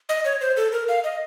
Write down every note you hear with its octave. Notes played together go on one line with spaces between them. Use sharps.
D#5
C#5
C5
A4
A#4
F5
D#5